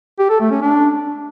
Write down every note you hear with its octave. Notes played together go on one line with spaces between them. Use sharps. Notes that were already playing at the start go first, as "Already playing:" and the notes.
G4
A4
A3
C#4
D4